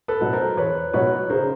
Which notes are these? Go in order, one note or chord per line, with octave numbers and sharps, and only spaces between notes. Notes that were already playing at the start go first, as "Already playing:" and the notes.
A4 B4
B2 F#3
A#4 C5
E2 B4 C#5
B2 F#3 B4 C#5
C#3 A#4 C5